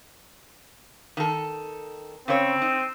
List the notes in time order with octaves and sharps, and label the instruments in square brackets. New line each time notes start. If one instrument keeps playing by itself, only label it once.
[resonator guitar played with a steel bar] D#3 A4
[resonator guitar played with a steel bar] C#3 C#4 C#5 [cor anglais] C4
[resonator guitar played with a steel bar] D#4